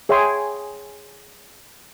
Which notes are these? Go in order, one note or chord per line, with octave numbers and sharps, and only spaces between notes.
G#4 C#5 E5 G5 G#5 C6